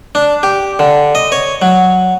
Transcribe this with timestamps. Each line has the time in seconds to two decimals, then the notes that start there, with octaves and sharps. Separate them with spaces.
0.15 D4
0.43 G4
0.79 D3
1.15 D#5
1.32 C#5
1.62 F#3